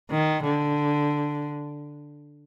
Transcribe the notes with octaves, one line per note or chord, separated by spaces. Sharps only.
D#3
D3